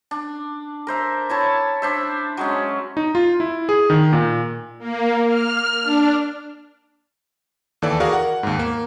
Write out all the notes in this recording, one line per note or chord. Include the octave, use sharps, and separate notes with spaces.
D4
A#4 C5 E5
E4 C#5 A5
D4 C5 E5
F#3 G#3 C#4
D#4
F4
E4
G#4
D#3
A#2
A#3
F6
D4
D#2 E3 A4 D5
F#4 G#4 A#4 D5 F5
F#5
D#2 G#2
A#3